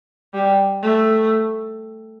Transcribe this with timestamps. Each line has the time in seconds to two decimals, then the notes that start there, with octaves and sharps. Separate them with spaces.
0.34 G3
0.83 A3